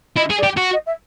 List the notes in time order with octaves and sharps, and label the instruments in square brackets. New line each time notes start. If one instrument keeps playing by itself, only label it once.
[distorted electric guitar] E4 [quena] D#5
[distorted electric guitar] G#4
[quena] D5
[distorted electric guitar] G4
F#4
[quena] D#5
E5